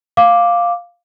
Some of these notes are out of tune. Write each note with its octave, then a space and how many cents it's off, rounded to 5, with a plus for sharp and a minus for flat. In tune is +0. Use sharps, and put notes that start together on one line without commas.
F5 +0 D6 +0